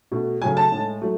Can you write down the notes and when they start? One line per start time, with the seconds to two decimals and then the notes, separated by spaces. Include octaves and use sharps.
0.12 B2 A3
0.41 C#3 F#3 A3 G#5
0.57 A5
0.72 A2 G#3
1.02 F#3 A3